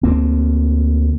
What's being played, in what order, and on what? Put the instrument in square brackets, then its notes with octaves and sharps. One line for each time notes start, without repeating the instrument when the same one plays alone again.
[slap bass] D2 A#3 C4